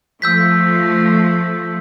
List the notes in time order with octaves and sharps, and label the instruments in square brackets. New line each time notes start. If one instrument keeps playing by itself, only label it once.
[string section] F3 A3 [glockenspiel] E6 G6 B6